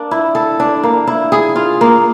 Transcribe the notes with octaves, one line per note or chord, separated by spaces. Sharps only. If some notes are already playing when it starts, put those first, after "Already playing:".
Already playing: A#3 D4
E4
A4
D4
A#3
E4
G#4
F4
A#3